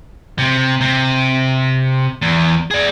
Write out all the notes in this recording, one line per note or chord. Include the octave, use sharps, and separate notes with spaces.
C3
C3
E2
G#4 D5